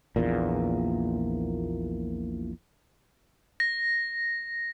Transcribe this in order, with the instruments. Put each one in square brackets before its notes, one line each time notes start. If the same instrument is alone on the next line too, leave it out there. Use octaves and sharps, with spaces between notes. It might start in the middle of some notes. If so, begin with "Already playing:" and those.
[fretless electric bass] A#1 E2 A#2
[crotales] A#6